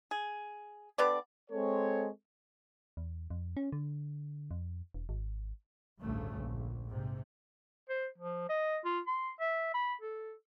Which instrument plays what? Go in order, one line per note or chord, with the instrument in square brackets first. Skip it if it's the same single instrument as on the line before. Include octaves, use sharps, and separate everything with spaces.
[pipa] G#4
D3 B3 G4 D5
[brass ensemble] G#3 C4 A4 C#5
[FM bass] E2
F2
C#4
D3
F2
E1
G#1
[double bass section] A1 D2 G2 C#3 A3
A#1
G#2 C3
[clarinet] C5
F3
D#5
F4
C6
E5
B5
A4